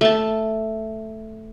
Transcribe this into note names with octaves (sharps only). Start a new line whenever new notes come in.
A3 A5